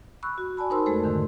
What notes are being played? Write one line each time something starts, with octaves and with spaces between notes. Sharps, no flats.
B5 C#6 E6 F#6
F#4
D5 G#5 A5 B5
D#4 A#4 C5 B5 C6 E6
F2 G#3 A3 A4 C5
G#2 D3 D#3